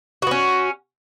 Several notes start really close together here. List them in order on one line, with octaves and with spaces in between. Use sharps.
F#4 B3 C#4